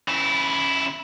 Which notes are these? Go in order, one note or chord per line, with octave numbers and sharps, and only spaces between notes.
C#3 E4